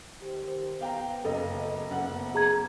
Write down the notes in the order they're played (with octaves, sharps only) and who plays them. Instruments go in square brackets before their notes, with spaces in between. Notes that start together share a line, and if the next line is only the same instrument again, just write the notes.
[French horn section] D#3 G4 C5
[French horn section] B3 [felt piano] F5 G5 A#5
[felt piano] F#1 D#5 F5 [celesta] A4
[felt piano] F#1 F#5 [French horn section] B3
[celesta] G#4 A#5 G#6